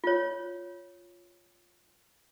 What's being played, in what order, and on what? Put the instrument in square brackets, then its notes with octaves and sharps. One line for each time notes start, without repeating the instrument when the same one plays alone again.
[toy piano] F4 C#5